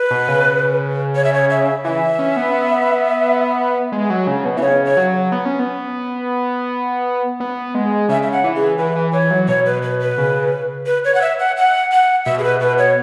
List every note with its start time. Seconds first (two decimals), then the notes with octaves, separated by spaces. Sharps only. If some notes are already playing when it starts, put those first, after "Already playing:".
Already playing: B4
0.11 B2
0.28 C#3
1.15 C#5
1.24 E5
1.34 C#5
1.50 E5
1.84 E3 E5
2.19 C#4
2.37 B3
3.92 G#3
4.10 F#3
4.27 C#3
4.45 B2
4.57 E3 E5
4.62 C#3 C#5
4.86 C#5
4.97 F#3
5.32 B3
5.45 C#4
5.59 B3
7.40 B3
7.75 G#3
8.09 C#3 E5
8.23 E5
8.32 F#5
8.44 E3
8.56 G#4
8.78 E3 B4
8.96 E3
9.13 E3 C#5
9.31 F#3
9.48 B2 C#5
9.66 B4
9.83 B4
10.00 B4
10.18 C#3
10.86 B4
11.05 C#5
11.15 F#5
11.21 E5
11.40 F#5
11.57 F#5
11.92 F#5
12.25 B2 E5
12.39 G#4
12.44 B4
12.60 B2 B4
12.78 C#5